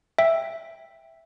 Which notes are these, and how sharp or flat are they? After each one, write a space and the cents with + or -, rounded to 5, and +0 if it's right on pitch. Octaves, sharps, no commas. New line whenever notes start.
E5 +0 G5 +5